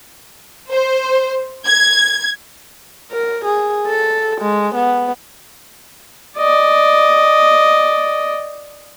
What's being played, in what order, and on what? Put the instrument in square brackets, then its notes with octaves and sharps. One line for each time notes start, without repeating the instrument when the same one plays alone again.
[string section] C5
G#6
[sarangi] A#4
G#4
A4
G#3
B3
[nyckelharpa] D5 D#5